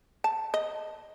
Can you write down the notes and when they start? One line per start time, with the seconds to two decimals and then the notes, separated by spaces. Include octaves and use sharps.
0.24 A5
0.54 D#5